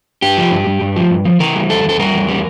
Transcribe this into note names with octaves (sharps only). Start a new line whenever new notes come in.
G2 G4
F3
G2
G2
G2
F3
G2
F3
E3 A#4
G3
E2 A4
E2 A4
G3 A#4
E2
G3